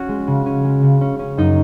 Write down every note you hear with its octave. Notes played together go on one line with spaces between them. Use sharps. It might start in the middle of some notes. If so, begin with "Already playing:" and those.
Already playing: C#4 F#4
G#3
C#3
C#4
G#3
C#3
C#4
C#4
F#2 D#4